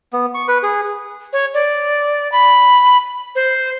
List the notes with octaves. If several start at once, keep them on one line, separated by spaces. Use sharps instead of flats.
B3
C#6
B4
G#4
C#5
D5
B5
C5